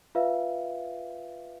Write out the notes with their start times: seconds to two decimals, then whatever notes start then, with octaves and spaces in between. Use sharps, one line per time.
0.15 F4 B4 E5 F5